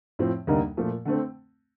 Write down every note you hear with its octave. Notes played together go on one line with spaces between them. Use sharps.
A2 F3 C4
D2 C3 G3 A#3 D#4
A#2 F3 A3
D3 A3 C4